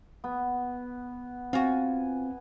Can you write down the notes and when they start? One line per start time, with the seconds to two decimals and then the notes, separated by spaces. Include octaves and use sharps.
0.24 B3
1.53 C4 F4 F#4 G#5